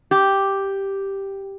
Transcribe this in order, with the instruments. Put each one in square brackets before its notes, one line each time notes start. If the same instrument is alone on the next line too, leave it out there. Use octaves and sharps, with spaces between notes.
[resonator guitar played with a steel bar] G4